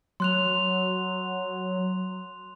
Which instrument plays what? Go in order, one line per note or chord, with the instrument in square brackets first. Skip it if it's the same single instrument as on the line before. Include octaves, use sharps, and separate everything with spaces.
[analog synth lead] F#3 [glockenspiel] C6 F#6 F7